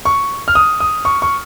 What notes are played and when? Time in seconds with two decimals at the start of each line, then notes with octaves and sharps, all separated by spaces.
0.05 C#6
0.48 F6
0.55 D#6
0.80 D#6
1.05 C#6
1.22 C#6